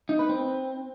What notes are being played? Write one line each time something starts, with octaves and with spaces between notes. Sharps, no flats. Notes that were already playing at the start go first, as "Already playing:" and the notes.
D#4
B4
C4